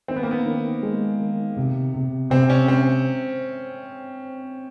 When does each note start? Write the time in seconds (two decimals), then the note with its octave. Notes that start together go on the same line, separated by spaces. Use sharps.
0.08 D#3 C4
0.16 B3
0.23 A#3
0.31 B3
0.46 D#3
0.83 G#3
1.20 D#3
1.57 C3
1.94 C3
2.30 C3 C4
2.50 C#4
2.68 C4